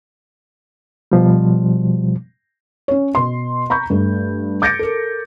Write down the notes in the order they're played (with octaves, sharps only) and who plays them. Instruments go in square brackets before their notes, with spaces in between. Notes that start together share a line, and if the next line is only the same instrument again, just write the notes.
[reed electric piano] B2 F3 G3
[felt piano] C#4 C#5
B2 C6
A#5 B5 C#6 G6
G2 A3
D6 G6 A6 A#6 C#7 D7
A4 A#4